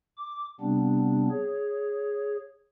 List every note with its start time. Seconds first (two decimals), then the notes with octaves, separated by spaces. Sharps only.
0.17 D6
0.61 C3 G3 B3 C4 D4
1.30 G#4 C#5